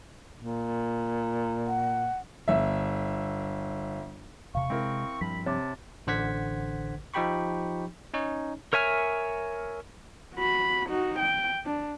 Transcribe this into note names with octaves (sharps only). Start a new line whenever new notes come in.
A#2
F#5
G1 E5
E1 C3 F5 C#6
C3 G#3 C4 E4 A#4
G2 F3 B5 B6
C3 C#5 A5 D6
A1 D3 C5 F#5 G#6 B6
F3 D#4 G4 G5 B5 C#6
C#4 D#4 C#5
A#4 C#5 E5 G#5 F6
F#4 B5
D#4 F#4
G5
D4